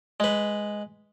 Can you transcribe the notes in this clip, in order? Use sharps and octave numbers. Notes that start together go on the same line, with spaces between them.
G#3 B4